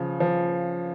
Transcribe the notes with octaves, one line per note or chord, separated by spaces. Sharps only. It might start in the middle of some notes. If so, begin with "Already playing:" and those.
Already playing: C#3 F3
F3